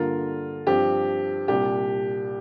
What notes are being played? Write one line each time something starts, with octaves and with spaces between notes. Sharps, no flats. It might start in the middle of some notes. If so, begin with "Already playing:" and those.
Already playing: G2 D3 A#3 F4 A#4
G2 F3 C4 G4
C2 A#2 G3 D4 G4